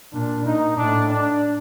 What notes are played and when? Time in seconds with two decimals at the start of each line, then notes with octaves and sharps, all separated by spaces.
0.13 A#2 D4
0.45 A#2 D#4
0.77 A2 D4
1.09 D4